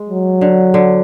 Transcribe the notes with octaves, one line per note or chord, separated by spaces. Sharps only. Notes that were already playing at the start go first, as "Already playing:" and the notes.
Already playing: G#3
F#3
D3
D3